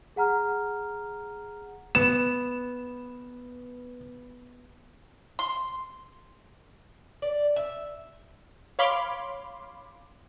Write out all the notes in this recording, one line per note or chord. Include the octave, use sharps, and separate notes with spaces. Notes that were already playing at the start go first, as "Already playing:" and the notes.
G#4 F#5 A#5 F6
B3 E7
C6
D5
E5
C#5 F5 B5 C6 D6